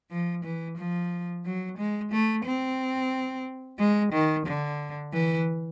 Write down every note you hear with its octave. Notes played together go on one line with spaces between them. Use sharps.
F3
E3
F3
F#3
G#3
A3
C4
G#3
D#3
D3
E3